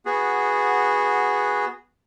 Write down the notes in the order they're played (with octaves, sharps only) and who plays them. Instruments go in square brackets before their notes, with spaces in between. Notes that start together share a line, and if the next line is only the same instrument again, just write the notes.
[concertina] B3 F#4 G#4